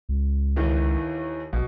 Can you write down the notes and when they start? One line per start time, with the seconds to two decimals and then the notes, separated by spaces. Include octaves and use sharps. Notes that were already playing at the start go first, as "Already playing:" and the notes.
0.09 C#2
0.56 D#2 D#3 E3
1.53 A#1 B2